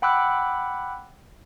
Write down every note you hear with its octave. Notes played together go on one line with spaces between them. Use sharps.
F#5 G5 B5 D6 E6 F#6